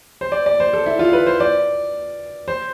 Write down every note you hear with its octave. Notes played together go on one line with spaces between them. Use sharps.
C5
D5
D5
C5
A4
E4
F4
B4
C5
D5
C5